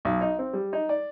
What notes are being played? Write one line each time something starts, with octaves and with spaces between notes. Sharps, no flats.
B1
D#4
C4
G3
D#4
D5